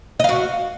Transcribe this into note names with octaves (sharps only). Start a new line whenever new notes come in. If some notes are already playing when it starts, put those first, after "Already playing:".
F#4 D#5 F5